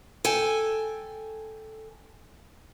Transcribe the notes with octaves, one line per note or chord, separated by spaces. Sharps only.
A4 G5 G#5